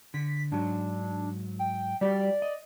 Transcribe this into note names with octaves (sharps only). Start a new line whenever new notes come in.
D3 B6
G#2 F#3 D4
G5
G3 F#4 G4 D5
D#5